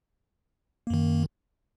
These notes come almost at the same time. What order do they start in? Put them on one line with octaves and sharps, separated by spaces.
A#3 F#2 D#3